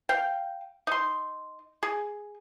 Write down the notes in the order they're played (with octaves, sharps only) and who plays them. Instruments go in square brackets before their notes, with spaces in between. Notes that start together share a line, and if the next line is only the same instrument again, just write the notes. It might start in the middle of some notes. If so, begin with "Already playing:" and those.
[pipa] F5 G5
D#4 C6
G#4